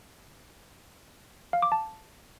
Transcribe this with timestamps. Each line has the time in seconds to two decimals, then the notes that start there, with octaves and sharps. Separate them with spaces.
1.53 F5
1.62 D6
1.72 A5